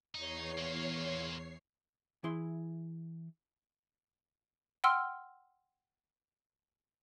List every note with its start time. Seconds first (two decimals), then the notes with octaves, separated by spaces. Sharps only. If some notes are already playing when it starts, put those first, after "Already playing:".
0.15 E2 D#4 C#5 C7
0.57 A#3 F4
2.24 E3 E4 G#4 C6
4.84 F#5 G5 C6 E6 F6